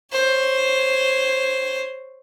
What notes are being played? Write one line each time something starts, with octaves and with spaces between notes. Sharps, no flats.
C5 C#5